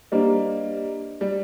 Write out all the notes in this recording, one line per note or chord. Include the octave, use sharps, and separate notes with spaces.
G3 A#3 D4 G4 C5 D#5
G3